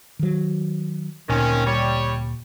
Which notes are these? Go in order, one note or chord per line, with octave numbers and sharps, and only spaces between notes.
D#3 F#3
D2 A#2 D#3 C4 C#4
G3 C#5